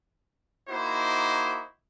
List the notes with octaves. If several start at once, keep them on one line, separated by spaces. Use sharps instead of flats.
A#3 D#4 E4 F#4 C5